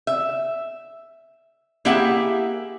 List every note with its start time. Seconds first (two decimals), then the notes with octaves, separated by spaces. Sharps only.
0.07 E5
1.85 A#3 E4 G4 G#4 E5 F#5